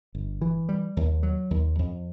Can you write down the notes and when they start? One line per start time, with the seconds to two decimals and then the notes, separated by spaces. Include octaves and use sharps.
0.15 G1
0.42 E3
0.69 G3
0.97 D#2
1.23 F#3
1.51 D#2
1.79 F2